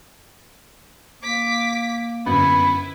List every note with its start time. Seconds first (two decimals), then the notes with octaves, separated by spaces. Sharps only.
1.23 A#3 D6 B6
2.26 G1 F#2 B3 E4 B4